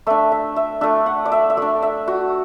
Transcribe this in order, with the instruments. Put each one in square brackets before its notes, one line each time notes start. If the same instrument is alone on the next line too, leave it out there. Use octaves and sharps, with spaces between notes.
[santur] A3 D4 E5
E5
E5
A3 D4 E5
F#5
D5
E5
E5
A3 D4 D5
E5
F#4